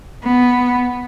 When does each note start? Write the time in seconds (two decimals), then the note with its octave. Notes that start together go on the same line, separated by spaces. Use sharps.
0.24 B3